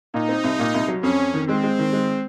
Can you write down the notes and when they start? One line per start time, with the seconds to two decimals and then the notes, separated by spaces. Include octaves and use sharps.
0.14 A#2 D#4
0.29 C4
0.44 C2
0.59 A#2
0.74 C2
0.88 F#3
1.03 F2 C#4
1.18 F2
1.34 D#3
1.48 G#3 C4
1.63 G#3
1.79 D#3
1.93 G#3